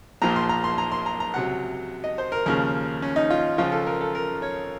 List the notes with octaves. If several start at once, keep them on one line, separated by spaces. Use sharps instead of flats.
A#1 A#2 F3 A#5
C6
A#5
C6
A#5
C6
A#5
A#5
C#2 C3 F#3 F#5
D#5
C5
A#4
D#2 C#3 F3 A#4
C#4
D#4
F4
C#2 C#3 F3 F4
A4
A#4
A4
A#4
C#5